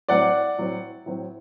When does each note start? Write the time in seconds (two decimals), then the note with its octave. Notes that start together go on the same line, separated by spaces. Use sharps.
0.09 A2 F#3 C4 D5 F#5
0.58 A2 F#3 C4
1.06 A2 F#3 C4